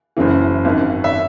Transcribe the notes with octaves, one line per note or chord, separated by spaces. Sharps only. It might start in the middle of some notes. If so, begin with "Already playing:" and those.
F#1 F#2 C#3 E3
G#1 F#2 D#3
E5